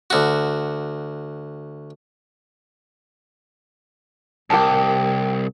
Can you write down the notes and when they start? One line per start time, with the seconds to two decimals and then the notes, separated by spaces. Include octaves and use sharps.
0.10 D2 F#4
4.50 C2 G4 A#4 A5